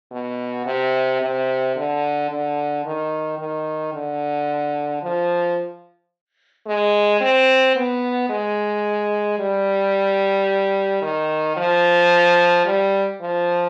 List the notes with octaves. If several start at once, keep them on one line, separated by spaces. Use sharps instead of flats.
B2
C3
C3
D3
D3
D#3
D#3
D3
F3
G#3
C4
B3
G#3
G3
D#3
F3
G3
F3